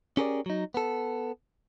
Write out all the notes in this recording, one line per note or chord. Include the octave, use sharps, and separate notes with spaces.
C#4 G4 G#4 A#4 C#5 D5
F#3 D#4
B3 A4